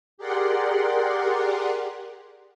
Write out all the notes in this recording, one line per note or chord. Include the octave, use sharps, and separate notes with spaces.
G4 G#4 A#4 D5 F#5 C6